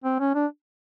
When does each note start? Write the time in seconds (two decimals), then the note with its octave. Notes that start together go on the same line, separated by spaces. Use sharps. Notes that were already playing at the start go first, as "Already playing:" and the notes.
0.04 C4
0.20 C#4
0.35 D4